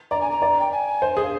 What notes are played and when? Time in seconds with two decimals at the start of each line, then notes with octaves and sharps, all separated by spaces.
0.11 D5 A#5
0.21 G#5
0.31 A#5
0.42 D5
0.60 G5
0.72 G#5
1.02 C5
1.17 G#4
1.23 F5